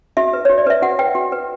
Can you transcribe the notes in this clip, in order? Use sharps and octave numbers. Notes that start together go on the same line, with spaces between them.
F#4 E5
B4
F#4 C#5
D5
B4 E5
F#4 F#5
B4 G5
F#4
B4